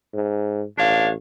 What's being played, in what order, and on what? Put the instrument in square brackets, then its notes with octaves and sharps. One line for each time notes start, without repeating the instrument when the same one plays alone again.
[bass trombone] G#2
[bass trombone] A1 [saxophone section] D4 C#5 F5